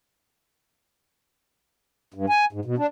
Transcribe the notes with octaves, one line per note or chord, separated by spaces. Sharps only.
G2
G#5
G#2
B2
D4